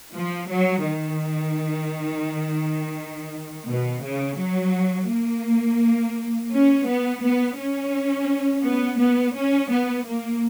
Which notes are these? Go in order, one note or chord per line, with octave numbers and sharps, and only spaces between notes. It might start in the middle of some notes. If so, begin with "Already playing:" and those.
F3
F#3
D#3
B2
C#3
F#3
A#3
C#4
B3
B3
C#4
B3
B3
C#4
B3
A#3